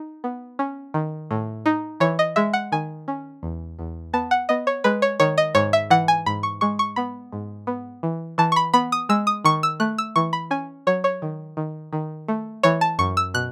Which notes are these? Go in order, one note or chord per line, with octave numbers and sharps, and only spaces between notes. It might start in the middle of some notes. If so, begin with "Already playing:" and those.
Already playing: D#4
B3
C#4
D#3
A2
D#4
E3 C#5
D#5
G#3 E5
F#5
D#3 G#5
C#4
E2
E2
B3 A5
F#5
B3 D#5
C#5
G#3 B4
C#5
D#3 C#5
D#5
G#2 C#5
E5
E3 F#5
G#5
G#2 B5
C#6
G#3 C#6
C#6
B3 B5
G#2
B3
E3
E3 A5
C#6
B5
B3 B5
D#6
G#3 E6
D#6
D#3 C#6
E6
A3 F#6
E6
E3 C#6
B5
C#4 G#5
F#3 C#5
C#5
D#3
D#3
D#3
A3
E3 C#5
A5
F#2 C#6
E6
B2 F#6